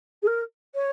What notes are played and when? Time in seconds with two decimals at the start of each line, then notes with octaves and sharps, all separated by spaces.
0.22 G#4
0.27 A#4
0.74 C#5